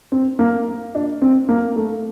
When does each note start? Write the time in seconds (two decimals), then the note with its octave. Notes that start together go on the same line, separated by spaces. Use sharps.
0.12 C4
0.39 A#3
0.95 D4
1.22 C4
1.49 A#3
1.76 A3